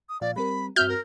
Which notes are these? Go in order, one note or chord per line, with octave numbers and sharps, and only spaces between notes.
D#6
A#2 F3 D5 F5
G3 C4 A#4 B5
G2 C4 F#4 E5 F6 G6
A#4